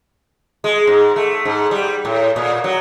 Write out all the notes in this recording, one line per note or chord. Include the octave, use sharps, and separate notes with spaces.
G#3
G#2
A3
G#2
G3
A2
A#2
F#3